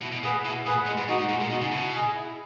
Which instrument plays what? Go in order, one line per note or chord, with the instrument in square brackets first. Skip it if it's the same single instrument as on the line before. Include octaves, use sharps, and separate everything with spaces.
[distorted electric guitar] B2 [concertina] E4
[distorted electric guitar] B2
[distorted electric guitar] A#2 [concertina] G#4 B4 F#5
[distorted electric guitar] B2 [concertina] E4
[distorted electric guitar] A#2 [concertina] G#4 B4 F#5
[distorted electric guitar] A#2 [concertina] G#3
[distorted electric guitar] G#2
[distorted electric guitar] A#2 [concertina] D#4 F#4
[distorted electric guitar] G#2
[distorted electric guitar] A#2 [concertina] G#3
[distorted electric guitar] A#2
[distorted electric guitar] B2 [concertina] D#4 F#4
[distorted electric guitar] C#3
[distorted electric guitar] B2 [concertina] E4
[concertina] G#4 D#5 G#5
E4